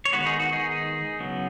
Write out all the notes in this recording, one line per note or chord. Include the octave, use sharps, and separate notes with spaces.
C#5
D#3 G#3 B3 F#4 B4
D#4 G#4
F#4
D#4 G#4
C#3 F#3 B3